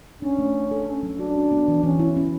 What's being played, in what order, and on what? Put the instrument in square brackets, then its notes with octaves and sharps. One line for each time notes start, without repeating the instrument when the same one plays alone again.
[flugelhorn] C#4 [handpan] D4
[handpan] A3
A3
A4
A3
F#3
[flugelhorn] D4 [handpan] F#4
[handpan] C#4
B3
E3
[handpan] E3 [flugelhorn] C#4
[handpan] E4
C#4